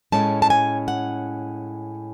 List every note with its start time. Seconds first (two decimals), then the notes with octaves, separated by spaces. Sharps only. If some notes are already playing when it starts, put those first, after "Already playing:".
0.12 A2 G#3 C#4 A5
0.42 A5
0.50 G#5
0.88 F#5